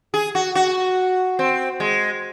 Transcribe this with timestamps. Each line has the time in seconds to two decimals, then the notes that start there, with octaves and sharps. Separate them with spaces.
0.14 G#4
0.35 F#4
0.55 F#4
1.39 C4
1.80 G#3